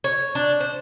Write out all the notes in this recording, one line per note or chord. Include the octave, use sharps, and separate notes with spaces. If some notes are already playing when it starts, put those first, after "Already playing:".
C#5
D4
C5